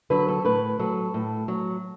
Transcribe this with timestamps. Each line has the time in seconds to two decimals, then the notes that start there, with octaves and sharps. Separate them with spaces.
0.10 D3 F#3 B4
0.28 A4
0.45 A2 B4
0.79 F#3 A4
1.14 A2
1.48 F#3